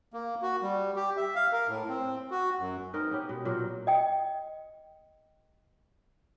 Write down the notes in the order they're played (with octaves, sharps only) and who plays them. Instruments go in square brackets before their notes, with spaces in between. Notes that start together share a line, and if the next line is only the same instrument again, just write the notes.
[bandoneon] A#3
F#4
G3
G4
E5
F5
A#4
A2
C4
F#4
F#2
[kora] C4 D#4 A#4 B4
B3 C#4 G4
B2
A#2 F#3 A#4
[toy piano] D#5 G5